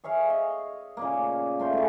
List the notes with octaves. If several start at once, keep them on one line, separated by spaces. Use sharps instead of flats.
G#4 C#5 E5 F5
D#5
A#2 C#3 A#3
A3 F4 C5
A2 C#3